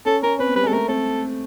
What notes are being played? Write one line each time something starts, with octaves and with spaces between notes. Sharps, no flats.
C#4 A4
C#4 A#4
C4 B4
B3
G3 B4
G#3 A4
A3 A#4
C4 A4